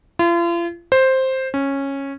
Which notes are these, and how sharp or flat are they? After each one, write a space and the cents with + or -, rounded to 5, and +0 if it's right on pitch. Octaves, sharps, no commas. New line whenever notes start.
F4 -40
C5 +5
C#4 -10